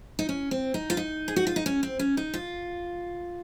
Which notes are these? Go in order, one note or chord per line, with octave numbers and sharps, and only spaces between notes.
D#4
C#4
C4
D#4
F4
D#4
G#4
F#4
F4
D#4
C#4
C4
C#4
D#4
F4